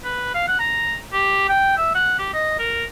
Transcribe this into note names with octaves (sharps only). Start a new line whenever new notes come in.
B4
F5
F#5
A#5
G4
G5
E5
F#5
G4
D#5
A#4